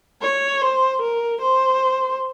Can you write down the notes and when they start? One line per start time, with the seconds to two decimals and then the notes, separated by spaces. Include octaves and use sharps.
0.22 C#5
0.62 C5
1.02 A#4
1.41 C5